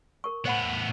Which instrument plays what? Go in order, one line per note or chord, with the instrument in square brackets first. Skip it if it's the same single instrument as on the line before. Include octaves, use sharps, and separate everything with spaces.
[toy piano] A#4 C#6
[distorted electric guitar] A2 B3 [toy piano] C5 F#5 B5